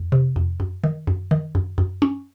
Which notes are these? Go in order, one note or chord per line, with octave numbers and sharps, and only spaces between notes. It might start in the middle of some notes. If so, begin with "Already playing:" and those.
Already playing: F2
C3
F2
F#2
D#3
F#2
D#3
F#2
F#2
C#4